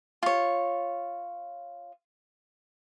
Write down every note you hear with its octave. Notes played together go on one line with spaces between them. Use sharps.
F4 C#5